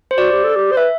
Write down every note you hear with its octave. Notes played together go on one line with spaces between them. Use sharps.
C5
F#4 D5
G4
A4
G4
C5
B4 E5